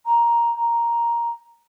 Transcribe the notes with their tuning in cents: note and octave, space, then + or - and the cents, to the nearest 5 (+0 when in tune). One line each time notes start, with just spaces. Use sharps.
A#5 +10
A#5 +5